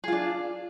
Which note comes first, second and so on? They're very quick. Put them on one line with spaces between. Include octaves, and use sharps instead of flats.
G#4 F4 D4